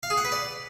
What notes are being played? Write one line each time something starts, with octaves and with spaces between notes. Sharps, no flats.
F5
G#4
F#5
B4
D5